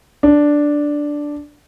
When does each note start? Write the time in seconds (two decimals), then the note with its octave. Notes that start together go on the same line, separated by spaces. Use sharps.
0.23 D4